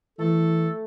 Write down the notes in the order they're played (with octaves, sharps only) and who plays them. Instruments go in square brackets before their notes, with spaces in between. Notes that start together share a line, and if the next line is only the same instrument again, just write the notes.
[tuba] E3 [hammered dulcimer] A3 [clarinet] A4